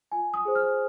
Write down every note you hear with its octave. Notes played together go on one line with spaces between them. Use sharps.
F4 G#5
D#6
G#4 C5
F6